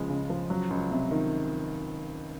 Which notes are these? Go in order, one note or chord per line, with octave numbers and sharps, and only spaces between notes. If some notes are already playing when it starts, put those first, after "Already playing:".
Already playing: C#2 F3 G#3
C#3
F3
F#3
C#2
C3
D#3